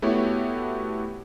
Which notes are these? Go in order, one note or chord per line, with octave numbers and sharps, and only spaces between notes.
A3 B3 E4 F#4 G4 C#5